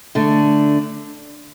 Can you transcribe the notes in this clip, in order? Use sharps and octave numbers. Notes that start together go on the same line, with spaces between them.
D3 A3 D4